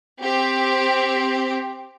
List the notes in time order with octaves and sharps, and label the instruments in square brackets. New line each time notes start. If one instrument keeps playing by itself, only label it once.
[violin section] C4 G4